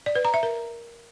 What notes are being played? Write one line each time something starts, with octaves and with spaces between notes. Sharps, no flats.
D5
B4
A#5
E5
A#4